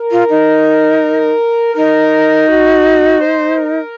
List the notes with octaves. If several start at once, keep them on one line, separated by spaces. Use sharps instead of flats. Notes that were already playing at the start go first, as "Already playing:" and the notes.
Already playing: A#4
F4
D#4
D#4 A#4
F#4
C5
A#4